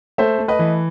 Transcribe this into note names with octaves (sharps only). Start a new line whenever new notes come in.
A3 C5 E5
A3
B4 D#5
E3